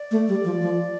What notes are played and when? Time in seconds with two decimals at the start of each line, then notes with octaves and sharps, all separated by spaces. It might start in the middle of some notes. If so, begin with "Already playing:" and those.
Already playing: D5
0.11 A3
0.28 G3
0.44 F3
0.61 F3